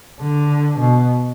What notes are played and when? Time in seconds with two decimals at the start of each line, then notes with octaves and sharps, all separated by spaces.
0.21 D3
0.79 B2